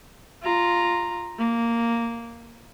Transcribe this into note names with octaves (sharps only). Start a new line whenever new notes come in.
F4 A#5
A#3